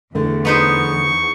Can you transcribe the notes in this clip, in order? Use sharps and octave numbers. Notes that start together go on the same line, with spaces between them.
E2 D3 A3
B3 D#4 C5 C#6